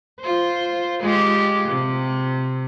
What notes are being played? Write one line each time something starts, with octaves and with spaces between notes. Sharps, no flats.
F4 C5
G#3 F4 G4
C3